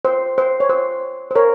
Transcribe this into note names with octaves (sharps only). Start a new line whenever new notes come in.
C5
C5
C#5
C5
C5
A#4 C#5